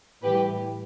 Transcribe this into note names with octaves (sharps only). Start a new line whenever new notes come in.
A2 E3 G3 G4 B4